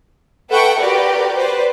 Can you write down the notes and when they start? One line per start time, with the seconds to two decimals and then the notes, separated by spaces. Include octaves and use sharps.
0.50 A4 B4 E5 F#5 G5 C#6
0.78 F#4 G4 A#4 B4 D5
1.37 B4 C5 D5